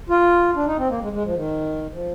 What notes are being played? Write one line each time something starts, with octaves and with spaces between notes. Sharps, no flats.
F4
D4
D#4
C4
A#3
G#3
G#3
F3
D#3
F3